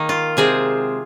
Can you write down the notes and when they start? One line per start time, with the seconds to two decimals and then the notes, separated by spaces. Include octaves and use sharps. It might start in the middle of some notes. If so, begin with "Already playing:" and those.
Already playing: D#3 A#3 D#4
0.09 F4
0.37 C3 G#3 C4 G#4